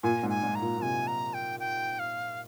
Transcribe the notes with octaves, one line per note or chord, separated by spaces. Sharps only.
A#2 G#5
G#2
G#5
G#2
A#5
A#2
A#2
C3 G#5
A#5
G5
G5
F5